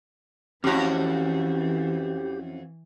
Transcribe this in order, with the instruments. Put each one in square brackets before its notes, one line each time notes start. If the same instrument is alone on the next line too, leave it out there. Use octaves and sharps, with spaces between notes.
[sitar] F2 F#4 [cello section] E3 [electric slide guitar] C#4 E4 [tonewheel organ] G4